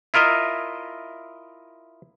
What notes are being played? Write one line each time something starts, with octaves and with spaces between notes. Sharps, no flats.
E4 F4 A#4 D#5 E5